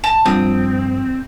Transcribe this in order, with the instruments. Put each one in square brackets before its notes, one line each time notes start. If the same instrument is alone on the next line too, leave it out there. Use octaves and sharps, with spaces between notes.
[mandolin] A5
[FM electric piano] G2 F3 [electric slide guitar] C4 [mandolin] D#6